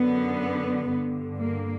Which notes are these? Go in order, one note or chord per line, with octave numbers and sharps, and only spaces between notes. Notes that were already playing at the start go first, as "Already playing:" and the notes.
Already playing: F#2 D3 B3
G2 D3
A#3